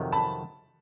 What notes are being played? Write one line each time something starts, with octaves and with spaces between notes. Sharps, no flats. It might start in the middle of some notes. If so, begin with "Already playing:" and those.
Already playing: F2 C3 D#3 F#3
A5 B5